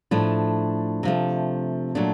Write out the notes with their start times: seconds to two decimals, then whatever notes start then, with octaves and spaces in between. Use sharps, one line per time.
0.11 A2 F3 A3 D4
1.03 C3 F3 A3
1.95 A#2 F#3 A3 D4